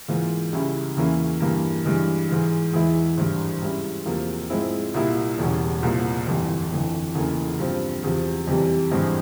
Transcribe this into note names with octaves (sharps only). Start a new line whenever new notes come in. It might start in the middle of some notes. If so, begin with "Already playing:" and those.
G#2 E3 A#3 F4
C#2 C#3 G3 C#4 E4
E2 E3 A#3 C#4 E4
G2 E3 A#3
G2 E3 G#3
G#2 E3 G#3
E2 E3 G#3 E4
G#1 G2 E3
G#2 G3 C#4 E4
E2 C3 F3 A#3
G#2 F3 G#3 C4 E4
C2 A#2 G3 A#3 E4
E1 E2 C#3 G3 C#4
C2 A#2 F3 A#3
G1 F2 E3 G3
G1 F2 E3
F1 E2 C#3 E3 A#3
G2 F3 C4
E2 C3 F3
F2 C3 E3 G3
G#1 G2 E3 G#3 C4